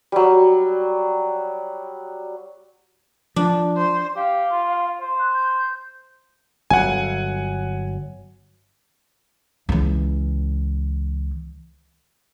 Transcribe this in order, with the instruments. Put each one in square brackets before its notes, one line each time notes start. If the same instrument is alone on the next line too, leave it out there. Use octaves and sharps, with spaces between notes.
[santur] F#3 G3
[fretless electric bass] F3 [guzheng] D4
[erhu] C5
[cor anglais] G4 [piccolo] F5
[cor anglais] F4
C5
[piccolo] F#6
G6
[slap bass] G1 F#3 [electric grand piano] F#5 G#5
[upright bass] C#2 E3